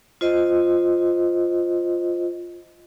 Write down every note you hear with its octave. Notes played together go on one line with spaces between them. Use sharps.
F4 C5 D#5